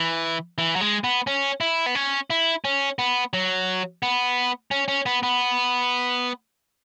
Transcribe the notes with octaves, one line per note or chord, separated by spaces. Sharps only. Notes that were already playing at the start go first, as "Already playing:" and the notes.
Already playing: E3
E3
F#3
G#3
B3
C#4
E4
B3
C#4
E4
C#4
B3
F#3
B3
C#4
C#4
B3
B3